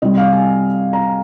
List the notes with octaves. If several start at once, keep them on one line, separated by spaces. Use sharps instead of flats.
C3 G3 D#5
F5
G#5
A#5